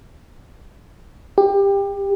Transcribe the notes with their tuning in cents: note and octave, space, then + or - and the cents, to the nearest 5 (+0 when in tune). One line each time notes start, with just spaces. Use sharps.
G4 +20